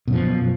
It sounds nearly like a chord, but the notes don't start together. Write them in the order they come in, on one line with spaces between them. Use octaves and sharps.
B2 F#2 F3